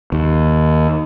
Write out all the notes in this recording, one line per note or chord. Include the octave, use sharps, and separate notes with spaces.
D#2